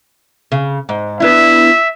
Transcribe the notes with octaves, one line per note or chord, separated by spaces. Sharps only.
C#3
G#2
B3 D4 E4 E5